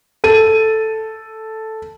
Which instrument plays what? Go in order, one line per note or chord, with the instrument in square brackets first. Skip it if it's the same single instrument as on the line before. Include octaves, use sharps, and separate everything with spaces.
[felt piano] A4 D#7